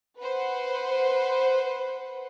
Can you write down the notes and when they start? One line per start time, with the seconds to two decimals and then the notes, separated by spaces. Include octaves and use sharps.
0.20 B4 C5 F#5